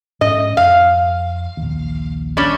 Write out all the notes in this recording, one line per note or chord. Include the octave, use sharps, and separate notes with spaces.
G#2 C#4 D#5
F2 F5
A#1 D#2
G3 C#4 D4